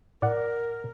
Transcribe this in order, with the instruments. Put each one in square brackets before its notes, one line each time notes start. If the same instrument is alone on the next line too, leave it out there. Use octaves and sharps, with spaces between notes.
[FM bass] A2 [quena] A#4 [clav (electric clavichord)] D5 F#5